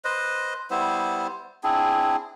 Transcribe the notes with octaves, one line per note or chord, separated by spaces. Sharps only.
B4 C5 D#5
G3 B3 E4 C5
C4 D4 E4 G#4